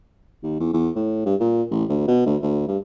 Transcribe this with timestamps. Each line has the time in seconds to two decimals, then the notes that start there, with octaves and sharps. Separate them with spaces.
0.43 D#2
0.60 E2
0.73 E2
0.96 A2
1.26 G2
1.40 A#2
1.71 A1
1.89 D2
2.08 B2
2.26 D2
2.42 D2
2.68 G2